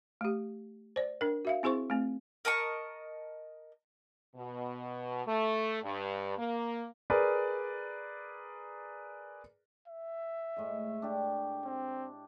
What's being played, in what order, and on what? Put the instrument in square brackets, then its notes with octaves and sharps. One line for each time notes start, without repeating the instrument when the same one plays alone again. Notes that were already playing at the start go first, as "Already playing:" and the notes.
[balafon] A3 G4
C5 D5
D4 A#4
F#4 E5 F5
C4 E4 G#4 C5 C#6
A3 C4
[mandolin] A#4 D#5 A5 C#6
[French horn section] B2
A3
G2
A#3
[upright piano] G#4 A#4 B4 D5
[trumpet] E5
[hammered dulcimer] A2 G#3 D#5
D4 G4
[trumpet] C4